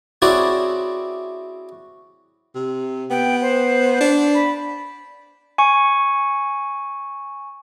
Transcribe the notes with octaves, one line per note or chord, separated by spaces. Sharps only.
C4 C#4 E4 F#4 G#4 D5
C3
B3 G5
C5
D4
B5
G#5 C#6